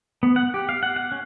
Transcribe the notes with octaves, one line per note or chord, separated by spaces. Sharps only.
B3
F#5
G4
F5
F#5
F#5
C#4